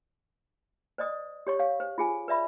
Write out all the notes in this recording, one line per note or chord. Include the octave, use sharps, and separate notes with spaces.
C5 D5 D#5 D#6
G4 C#5 C#6
C#5 F5
C5
F4 G#4 G#5
B4 D5 E5 B5